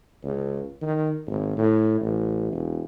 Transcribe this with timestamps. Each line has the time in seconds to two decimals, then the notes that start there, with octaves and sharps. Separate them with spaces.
0.23 C#2
0.82 D#3
1.27 G#1
1.57 A2
2.01 A1
2.52 E1